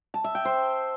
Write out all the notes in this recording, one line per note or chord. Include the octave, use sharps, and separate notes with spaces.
A5
E5
G5
C5